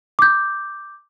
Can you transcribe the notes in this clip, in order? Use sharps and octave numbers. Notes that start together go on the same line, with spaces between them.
D6 G6